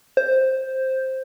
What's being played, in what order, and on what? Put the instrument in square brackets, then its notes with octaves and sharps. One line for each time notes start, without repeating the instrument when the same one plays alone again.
[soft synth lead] C5